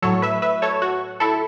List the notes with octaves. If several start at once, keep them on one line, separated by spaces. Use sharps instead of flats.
A2 F#3 A4 C#5
B4 E5
B4 E5
A4 C#5
F#4
E4 A4